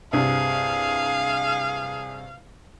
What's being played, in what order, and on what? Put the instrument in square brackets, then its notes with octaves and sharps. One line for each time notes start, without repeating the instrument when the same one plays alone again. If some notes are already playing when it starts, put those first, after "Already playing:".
[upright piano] C2 G2 C3 [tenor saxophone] G#4 [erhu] F5